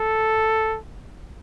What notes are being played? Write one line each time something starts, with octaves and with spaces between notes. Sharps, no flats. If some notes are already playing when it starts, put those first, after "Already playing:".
Already playing: A4